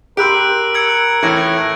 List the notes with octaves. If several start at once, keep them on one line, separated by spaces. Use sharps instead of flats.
G4 A#4 B5 C6 E6 F#6 D7
E6 G#6 C#7
A2 E3 F#6 G#6 A#6